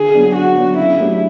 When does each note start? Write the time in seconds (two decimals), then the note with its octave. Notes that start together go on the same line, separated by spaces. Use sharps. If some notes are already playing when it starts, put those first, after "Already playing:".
Already playing: D3 G#4
0.14 F#3 B3 D4
0.35 D3 F#4
0.56 F#3 B3 D4
0.77 C#3 E4
0.98 F#3 A3 D4 G4